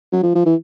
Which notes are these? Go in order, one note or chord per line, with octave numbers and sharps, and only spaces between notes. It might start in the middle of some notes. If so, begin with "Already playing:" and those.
F#3
F3
F3
E3